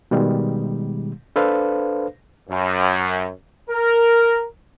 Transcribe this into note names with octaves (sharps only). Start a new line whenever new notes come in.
B2 D#3 G3 G#3
D4 A4 B4 C5 F5
F#2
A#4